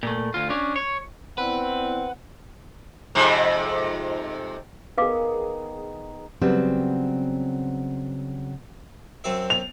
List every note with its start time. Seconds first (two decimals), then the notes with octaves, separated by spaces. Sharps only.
0.03 A#2 A3
0.34 D2 F4
0.50 C#4 D4
0.76 C#5
1.38 B3 C4 E4 B4 D5 F#5
3.15 F2 G#2 C3
4.98 D#3 B3 G#4 B4 F5 D6
6.42 C#3 F#3 G3 B3 C4
9.24 F#2 C4 E5
9.50 F7